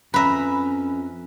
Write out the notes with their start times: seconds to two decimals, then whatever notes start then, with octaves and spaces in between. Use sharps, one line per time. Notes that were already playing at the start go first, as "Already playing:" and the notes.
0.14 F2 C#4 B4 E5 A#5 B5